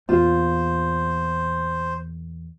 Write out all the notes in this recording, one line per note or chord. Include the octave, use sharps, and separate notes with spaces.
E2 A#2 F4 C5